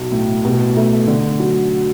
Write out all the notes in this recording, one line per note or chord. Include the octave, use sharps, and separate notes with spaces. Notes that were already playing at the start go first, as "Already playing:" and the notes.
Already playing: B1
A2
B2
A3
D3
F#3